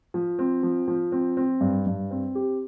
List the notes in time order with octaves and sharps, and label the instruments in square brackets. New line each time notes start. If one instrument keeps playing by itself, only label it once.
[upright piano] F3
C4
F3
F3
C4
C4
G2
G2
C4
G4